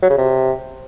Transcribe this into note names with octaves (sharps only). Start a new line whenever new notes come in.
F#3
C#3
C3